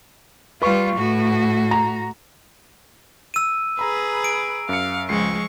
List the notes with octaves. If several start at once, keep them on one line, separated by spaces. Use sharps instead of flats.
G3 F4 B4 C#6
A2 F#4
A#5
E6 D#7
G#4 B4 A#5 B5
D7
F#2 F5 C#7
C#2 F3 G#3 C#6 C7